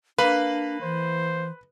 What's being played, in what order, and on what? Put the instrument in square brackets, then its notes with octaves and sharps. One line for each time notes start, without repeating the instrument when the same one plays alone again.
[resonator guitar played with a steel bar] A#3 [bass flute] D4 [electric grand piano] B4 B5
[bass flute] E3 [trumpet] C5